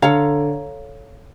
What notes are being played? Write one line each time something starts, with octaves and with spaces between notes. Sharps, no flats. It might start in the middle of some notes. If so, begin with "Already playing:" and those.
D3 A4 C#5 F5 A#5